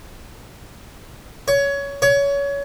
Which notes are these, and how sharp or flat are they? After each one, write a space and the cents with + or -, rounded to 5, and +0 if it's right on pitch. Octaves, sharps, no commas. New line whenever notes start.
C#5 +20
C#5 +25